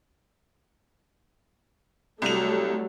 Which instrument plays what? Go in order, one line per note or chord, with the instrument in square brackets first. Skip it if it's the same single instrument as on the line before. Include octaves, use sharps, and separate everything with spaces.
[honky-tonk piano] C2 F7 [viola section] F#3 G3 A3